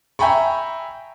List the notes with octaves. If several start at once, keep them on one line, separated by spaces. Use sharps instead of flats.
E5 G5 G#5 A#5 B5 C#6